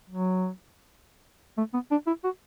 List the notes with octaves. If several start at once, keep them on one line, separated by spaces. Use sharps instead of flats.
F#3
A3
B3
D4
E4
F#4